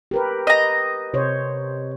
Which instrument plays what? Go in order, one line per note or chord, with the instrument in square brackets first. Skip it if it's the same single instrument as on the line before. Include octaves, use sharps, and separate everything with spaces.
[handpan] G4 A#4 B4
[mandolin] D#5 A#5
[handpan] C3 C5 C#5